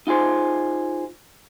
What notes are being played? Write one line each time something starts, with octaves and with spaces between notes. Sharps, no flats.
D#4 F4 G#4 C5